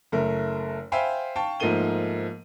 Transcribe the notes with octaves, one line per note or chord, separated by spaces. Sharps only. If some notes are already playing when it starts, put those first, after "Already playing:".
F#1 A3 A#4
C5 E5 F5 G5 G#5 B5
F5 G5 A5 C#6
G#2 F3 A3 A#3 D#7 G7